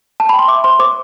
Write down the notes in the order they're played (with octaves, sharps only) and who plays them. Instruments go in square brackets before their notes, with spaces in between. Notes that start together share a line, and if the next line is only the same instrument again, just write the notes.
[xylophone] A5
G5 B5
C6
E5 D6
C5 C6
C5 D6